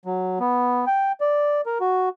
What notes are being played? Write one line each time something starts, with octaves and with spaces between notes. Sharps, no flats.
F#3
B3
G5
D5
A#4
F#4